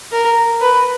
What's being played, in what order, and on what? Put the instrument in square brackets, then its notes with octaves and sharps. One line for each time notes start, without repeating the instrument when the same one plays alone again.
[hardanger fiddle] A#4
B4